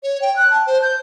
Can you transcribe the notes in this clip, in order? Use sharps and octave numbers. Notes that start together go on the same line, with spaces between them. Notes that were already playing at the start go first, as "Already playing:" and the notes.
C#5
G5
F#6
A5
C5
G6